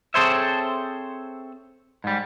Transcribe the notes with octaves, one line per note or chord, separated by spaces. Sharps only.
C4 G#4 A4 C5 C#5 E5
G#2 G3